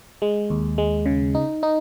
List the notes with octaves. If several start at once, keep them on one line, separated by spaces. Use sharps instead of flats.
G#3
D#2
G#3
C#3
D#4
D#4